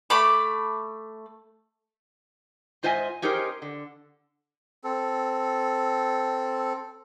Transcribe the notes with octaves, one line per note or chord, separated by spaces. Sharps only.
A3 B5 D6
G#2 F4 C5 D#5 E5 G#5
C#4 D#4 G4 G#4 A#4 C5
D3
C4 A4